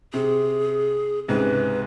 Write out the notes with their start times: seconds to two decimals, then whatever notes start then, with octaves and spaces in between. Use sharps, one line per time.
0.14 C3 G#4
1.28 C#2 G#2 C3 B4